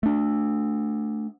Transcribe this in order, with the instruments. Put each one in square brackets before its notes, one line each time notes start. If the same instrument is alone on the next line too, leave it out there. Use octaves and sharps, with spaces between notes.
[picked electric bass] A3 D4